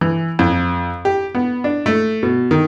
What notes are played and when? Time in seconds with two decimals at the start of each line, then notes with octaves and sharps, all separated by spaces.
0.01 E3
0.39 F2
1.05 G4
1.35 B3
1.64 D4
1.86 A3
2.23 B2
2.51 D#3